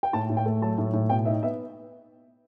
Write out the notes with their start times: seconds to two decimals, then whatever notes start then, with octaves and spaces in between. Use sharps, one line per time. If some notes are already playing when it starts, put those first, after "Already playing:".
0.03 G5
0.13 A2 A5
0.30 A2
0.37 G5
0.46 A3
0.62 F#3 A5
0.78 A2
0.93 A2
1.09 B2 G5
1.25 D#4 E5
1.43 B3 E5